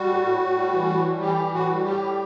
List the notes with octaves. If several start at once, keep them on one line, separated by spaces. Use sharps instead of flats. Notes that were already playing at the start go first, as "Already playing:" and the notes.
Already playing: G3 F#4
A2
A2
A2
G3
E3
A2
G3
E3 G4
E3
A2 F#4
G3
A2 G4
G3